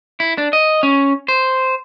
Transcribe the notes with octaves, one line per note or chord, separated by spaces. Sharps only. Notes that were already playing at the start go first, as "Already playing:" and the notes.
E4
D4
D#5
C#4
C5